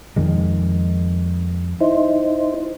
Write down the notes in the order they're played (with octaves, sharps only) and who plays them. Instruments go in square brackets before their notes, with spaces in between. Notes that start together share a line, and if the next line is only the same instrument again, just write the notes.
[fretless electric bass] F2 D#3 G#3
[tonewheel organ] D#4 E4 C5